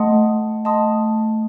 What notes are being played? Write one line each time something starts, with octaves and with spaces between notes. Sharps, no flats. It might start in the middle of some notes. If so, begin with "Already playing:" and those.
Already playing: A3 D#5 F#5 A5 C6 D#6
D#5 F#5 A5 C6 D#6